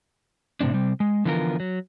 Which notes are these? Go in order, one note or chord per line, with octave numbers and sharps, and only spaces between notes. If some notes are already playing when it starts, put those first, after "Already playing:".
A2 C3 G3 C4 D4
C3 G3 C4
G#3
D3 E3 F3 B3 F4 A#4
F#3